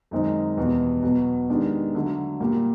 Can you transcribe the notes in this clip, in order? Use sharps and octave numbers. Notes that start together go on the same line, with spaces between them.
F#2 D#3 G#3 C4 D#4
E2 B2 G3 B3
B2 F#3 B3
D#3 G#3 B3 D4 G4
D3 F#3 A3
A#2 G3 A#3